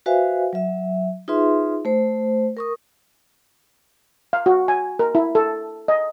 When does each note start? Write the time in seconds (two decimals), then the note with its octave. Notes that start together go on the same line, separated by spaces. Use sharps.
0.06 F#4 B4 C5 E5 F5 G#5
0.53 F#3 E5
1.28 D#4 F4 G#4 B4 E5 C6
1.85 A3 C5
2.57 A#4 C#6 D#6
4.33 F5
4.46 F#4
4.68 G#5
4.99 A#4
5.15 E4
5.35 A4
5.88 D#5